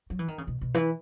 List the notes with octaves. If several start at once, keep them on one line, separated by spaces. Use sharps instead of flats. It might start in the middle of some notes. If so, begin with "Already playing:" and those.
F#3
E3
D#3
C#3
B2
B2
E3